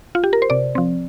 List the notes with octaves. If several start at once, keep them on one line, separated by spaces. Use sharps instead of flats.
F4
G4
A#4
C5
C3 D5
F3 C4